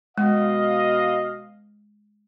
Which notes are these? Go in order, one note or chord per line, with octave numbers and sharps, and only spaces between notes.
B2 G#3 D#5 F5